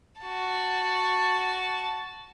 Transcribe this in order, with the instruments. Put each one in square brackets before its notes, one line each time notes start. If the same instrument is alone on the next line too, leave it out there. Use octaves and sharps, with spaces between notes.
[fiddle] F#4 A5